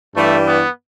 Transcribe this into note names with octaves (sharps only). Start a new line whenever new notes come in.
G2 E3 G3 A3
B3